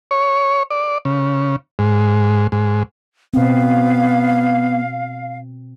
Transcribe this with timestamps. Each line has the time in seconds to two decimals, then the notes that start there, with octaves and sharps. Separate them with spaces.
0.11 C#5
0.70 D5
1.05 C#3
1.79 G#2
2.52 G#2
3.34 B2 B3 C4 F5